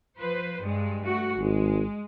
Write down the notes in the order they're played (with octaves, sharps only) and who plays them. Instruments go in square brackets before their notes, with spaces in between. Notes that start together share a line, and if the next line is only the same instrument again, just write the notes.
[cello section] F3 B4 C5
G2 G#3
A3 F#4
[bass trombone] G#1 [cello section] G#3